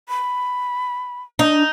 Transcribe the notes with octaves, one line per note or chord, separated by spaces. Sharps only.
B5
D4 D#4